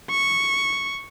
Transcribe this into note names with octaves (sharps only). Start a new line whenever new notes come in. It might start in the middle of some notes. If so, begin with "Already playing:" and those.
C#6